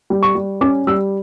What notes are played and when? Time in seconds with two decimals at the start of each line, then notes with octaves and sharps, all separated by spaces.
0.10 G3
0.23 C#6
0.35 G3
0.61 C#4 D6
0.87 G3 E6